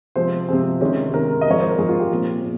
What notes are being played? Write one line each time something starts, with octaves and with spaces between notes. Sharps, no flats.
C3 F3 G#3 C4 C5
C3 F3 G#3 C4
C3 D#3 G#3 C#4
C3 D#3 G#3 C#4 A#4
D#5
G#2 F3 C4 C#5
C5
A#4
G#2 F3 C4 G#4
F4
G4
A#2 F3 C4 G#4
A#2